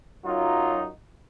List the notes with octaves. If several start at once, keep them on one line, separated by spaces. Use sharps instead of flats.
F#2 F#3 D#4 F4